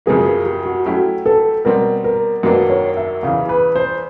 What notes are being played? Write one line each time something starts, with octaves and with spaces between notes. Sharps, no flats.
F#2 C#3 F3 A#3 G#4
G#4
G4
F#4
F#3 A3 C#4 E4 F#4 G4
A4
B2 G3 C4 A#4
A#4
F#2 D#3 F#3 A#3 D4 B4
C#5
E5
E2 C#3 E3 F5
B4
C5